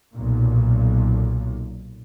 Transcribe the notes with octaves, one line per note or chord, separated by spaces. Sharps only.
B1 A#2